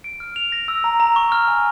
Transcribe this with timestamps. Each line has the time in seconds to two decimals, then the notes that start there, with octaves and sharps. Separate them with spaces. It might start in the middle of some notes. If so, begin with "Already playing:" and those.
0.04 D7
0.20 F6
0.36 F7
0.52 A#6
0.68 E6
0.84 A#5
1.00 A#5
1.16 C#6
1.32 F6
1.48 G#5